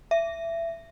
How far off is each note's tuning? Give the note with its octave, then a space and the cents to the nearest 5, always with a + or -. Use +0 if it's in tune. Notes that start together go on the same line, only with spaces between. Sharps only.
E5 +20